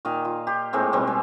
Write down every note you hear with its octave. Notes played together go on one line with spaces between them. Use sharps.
A#2 D#3 D#5 F5
F4
G4 C6
A2 G#3 A#3 C4
B2 G3 C4
G#3